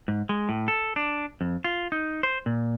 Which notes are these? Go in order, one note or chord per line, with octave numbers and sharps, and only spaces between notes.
G#2
G#3
A2
A4
D4
F2
F4
D#4
C5
A#2